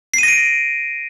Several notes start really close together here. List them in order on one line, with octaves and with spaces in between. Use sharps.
C7 D#7 A#6 D7